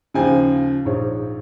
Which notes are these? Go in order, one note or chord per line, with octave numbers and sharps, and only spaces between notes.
D#2 C#3 F3 G#5
A#1 G#2 F3 C#5